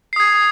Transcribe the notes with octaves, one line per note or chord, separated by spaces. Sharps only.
D#6 G#6 C7